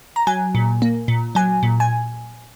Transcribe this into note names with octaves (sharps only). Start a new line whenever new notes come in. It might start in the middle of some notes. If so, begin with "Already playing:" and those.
A#5
F#3 G#5
A#2
A#3
A#2
F#3 G#5
A#2
G#5